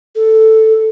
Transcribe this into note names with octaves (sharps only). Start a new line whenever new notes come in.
A4